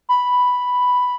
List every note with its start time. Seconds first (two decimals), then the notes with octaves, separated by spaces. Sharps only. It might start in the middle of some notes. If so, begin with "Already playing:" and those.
0.09 B5